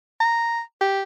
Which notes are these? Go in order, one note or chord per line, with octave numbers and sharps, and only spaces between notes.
A#5
G4